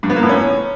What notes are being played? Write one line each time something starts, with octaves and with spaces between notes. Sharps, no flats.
G2
B3
A#3
A2
C#4